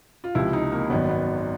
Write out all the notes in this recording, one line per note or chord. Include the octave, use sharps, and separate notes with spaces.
F4
C#2 C3 F3 E4
D#4
A#3
G#1 F#2 D#3 F#3 B3
B3